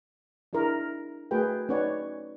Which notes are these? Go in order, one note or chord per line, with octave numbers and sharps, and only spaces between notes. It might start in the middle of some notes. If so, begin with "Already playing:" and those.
D4 E4 G#4 A#4
A3 F#4 G#4 A#4 B4 G5
C#4 D#4 B4 C#5 D5 F#5